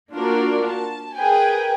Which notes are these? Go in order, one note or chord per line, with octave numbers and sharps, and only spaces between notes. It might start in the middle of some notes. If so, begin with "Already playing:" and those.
A#3 D4 F4 F#4 A#4 D5
A5
G#4 A#4 B4 G5 G#5